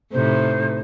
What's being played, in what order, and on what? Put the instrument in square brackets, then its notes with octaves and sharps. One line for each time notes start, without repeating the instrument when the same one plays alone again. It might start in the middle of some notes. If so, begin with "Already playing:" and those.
[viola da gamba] A2 C3 D#4 [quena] C5